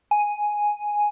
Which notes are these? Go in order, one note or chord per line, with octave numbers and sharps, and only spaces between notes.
G#5